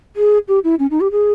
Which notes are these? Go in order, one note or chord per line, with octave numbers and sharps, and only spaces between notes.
G#4
G4
E4
C#4
D#4
G4
G#4